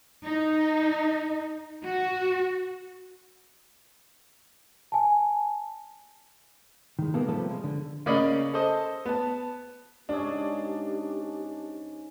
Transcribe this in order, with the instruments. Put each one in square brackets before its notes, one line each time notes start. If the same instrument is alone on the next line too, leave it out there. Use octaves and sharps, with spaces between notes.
[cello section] D#4
F#4
[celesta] G#5 A5
[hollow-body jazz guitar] D#3 G#3
B2 G3 A#3 B3 G#4 A4
C3 F3 G3 A3 B3 A4
G#3
D3
[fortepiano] C#3 A#3 C#4 D5 D#5 B5
A4 C5 D#5
B3 A5
[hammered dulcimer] G#2 C#4 G#4 [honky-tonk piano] D4 [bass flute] G4